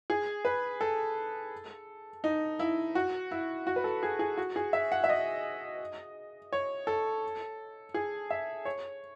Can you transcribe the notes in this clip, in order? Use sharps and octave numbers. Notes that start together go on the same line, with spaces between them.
G#4
B4
A4
D#4
E4
F#4
E4
F#4
B4
A4
G#4
G#4
F#4
G#4
E5
F#5
E5
D#5
C#5
A4
G#4
E5
C#5